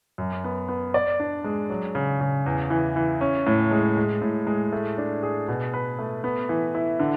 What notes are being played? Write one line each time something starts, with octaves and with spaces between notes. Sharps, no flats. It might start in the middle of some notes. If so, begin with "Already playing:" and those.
F#2
B3
B3
D5
D4
G#3
F#3
C#3
C#3
E2
E3
E3
C#4
A2
G#3
G#3
A2
G#3
A3
D4
G#4
B2
B4
A3
B3
E3
E4
D3